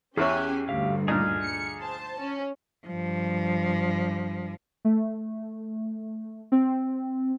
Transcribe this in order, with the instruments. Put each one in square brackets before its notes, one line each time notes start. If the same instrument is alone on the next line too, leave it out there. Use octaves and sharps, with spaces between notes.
[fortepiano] E2 E4 C#5 [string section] C#4 G4 G#5 [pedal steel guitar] G#4 F#6
[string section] D2 G2 [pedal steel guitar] G4 F5
[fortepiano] A#2 D4 D#4 [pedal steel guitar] G#4 F6
[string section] C#7
C5 A5
C#4
[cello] G2 F3
[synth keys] A3
C4